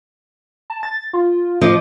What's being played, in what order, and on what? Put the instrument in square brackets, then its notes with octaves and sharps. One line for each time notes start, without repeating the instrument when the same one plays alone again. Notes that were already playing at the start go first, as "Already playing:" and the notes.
[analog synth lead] A5
A6
F4
[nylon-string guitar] F3 D#5 [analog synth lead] D6